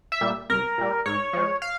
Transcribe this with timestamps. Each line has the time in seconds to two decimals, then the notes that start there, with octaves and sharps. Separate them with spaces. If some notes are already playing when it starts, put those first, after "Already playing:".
0.12 E5
0.21 A#2 G3
0.50 C2 A#4
0.78 A#2 G3
1.06 G#2 C#5
1.33 F3 G#3
1.62 F5